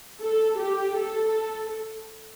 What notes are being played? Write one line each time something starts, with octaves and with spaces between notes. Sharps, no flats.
A4
G4
A4